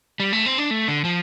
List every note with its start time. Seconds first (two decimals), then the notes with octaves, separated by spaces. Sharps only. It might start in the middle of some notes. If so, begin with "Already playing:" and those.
0.20 G3
0.32 A3
0.46 C4
0.58 D4
0.71 A3
0.88 D3
1.04 F3